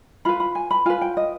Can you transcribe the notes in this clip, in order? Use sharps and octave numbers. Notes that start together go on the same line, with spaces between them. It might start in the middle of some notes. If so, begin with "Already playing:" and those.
F4 B4 B5
B5
G#5
B5
F4 B4 G#5
G5
D#5